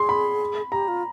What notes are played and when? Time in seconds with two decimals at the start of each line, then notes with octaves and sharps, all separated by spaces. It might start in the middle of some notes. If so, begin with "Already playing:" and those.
Already playing: G#4 C6
0.09 B5
0.72 G4 A#5
0.88 F4